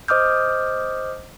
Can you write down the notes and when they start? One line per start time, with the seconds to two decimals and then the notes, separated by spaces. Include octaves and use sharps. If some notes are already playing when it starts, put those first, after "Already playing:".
0.08 C5 D#5 D6 D#6 F6 G6